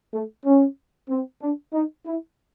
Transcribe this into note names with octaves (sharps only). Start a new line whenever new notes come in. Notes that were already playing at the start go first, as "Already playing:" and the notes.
A3
C#4
C4
D4
D#4
E4